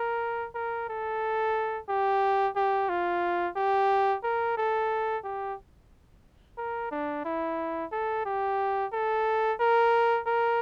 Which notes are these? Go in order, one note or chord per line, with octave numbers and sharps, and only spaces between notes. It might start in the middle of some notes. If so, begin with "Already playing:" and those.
Already playing: A#4
A#4
A4
G4
G4
F4
G4
A#4
A4
G4
A#4
D4
E4
A4
G4
A4
A#4
A#4